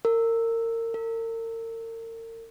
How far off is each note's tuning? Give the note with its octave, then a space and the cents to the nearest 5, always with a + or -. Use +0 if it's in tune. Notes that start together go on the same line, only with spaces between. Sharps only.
A#4 -30
A#4 -40